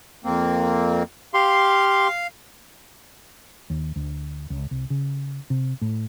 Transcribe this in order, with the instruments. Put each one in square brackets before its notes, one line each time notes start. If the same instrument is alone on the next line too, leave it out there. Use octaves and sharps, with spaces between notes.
[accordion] F2 A#3 C4
[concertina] G4 C6 [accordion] F5
[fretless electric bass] D#2
D2
C#2
C2
C#3
C3
A2